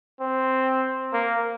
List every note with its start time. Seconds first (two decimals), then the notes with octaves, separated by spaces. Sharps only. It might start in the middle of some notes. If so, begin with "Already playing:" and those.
0.20 C4
1.13 A#3